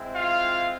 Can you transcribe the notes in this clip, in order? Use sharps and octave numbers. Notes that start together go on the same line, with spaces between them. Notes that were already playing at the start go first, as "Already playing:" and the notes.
Already playing: G#3 C4 E4
F4 F5